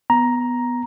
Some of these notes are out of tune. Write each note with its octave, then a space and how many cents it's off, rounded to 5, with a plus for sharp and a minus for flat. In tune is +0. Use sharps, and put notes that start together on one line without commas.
B3 +0 A#5 +10